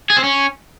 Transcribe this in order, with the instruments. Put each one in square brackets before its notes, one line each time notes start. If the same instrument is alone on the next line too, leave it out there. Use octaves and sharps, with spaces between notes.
[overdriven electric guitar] G#4
C4
C#4